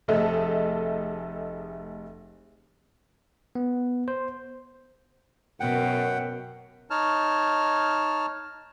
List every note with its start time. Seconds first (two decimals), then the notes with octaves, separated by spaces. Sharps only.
0.08 F1 A3 G#4 A4 D#5 E5
3.55 B3
4.08 C5
5.60 F#2 B2 A#4 F#5 G5
6.90 D#4 C#5 A5 F6